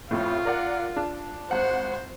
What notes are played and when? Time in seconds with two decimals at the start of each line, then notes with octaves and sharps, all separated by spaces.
0.11 A1 F2 A2 F4
0.45 A#4 D5 F#5
0.96 D4
1.51 G#1 C5 F#5